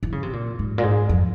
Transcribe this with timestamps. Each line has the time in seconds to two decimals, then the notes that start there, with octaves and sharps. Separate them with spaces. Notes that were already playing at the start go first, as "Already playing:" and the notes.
0.03 E3
0.12 C#3
0.23 C3
0.33 A#2
0.59 G#2
0.78 A#2
0.83 G#2
1.09 F2